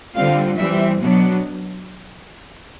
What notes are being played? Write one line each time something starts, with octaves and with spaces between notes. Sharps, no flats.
D3 G3 C4 F4 F5
E3 G3 C4 E5
B2 F#3 B3 D4